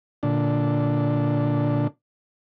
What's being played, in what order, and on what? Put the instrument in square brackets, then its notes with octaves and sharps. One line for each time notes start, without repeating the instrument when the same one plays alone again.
[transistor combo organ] A#2 D3 D4